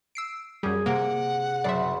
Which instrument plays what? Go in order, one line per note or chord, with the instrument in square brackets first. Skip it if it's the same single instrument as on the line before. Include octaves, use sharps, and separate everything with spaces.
[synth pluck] E6 C7 D7
[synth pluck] F#2 G3 [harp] G#4
[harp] C3 D7 [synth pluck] A#3 [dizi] F#5
[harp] F#1 C#3 C6 [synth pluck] D5 E5